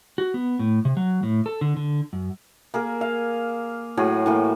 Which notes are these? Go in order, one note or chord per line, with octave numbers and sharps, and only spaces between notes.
F#4
B3
A2
C3
F#3
A2
A4
D3
D3
F#2
A#3 G#4 A#4
F5
A2 F#3 G#4
A2 E3 A#3